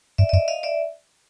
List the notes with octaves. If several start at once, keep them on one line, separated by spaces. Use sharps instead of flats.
G2 D5 E5
D#5
F#2 D5 E5
D#5 F5
D5 E5